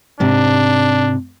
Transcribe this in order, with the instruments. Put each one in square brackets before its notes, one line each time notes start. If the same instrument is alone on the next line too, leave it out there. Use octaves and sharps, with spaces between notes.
[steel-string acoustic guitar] G#2 C3 [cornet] D4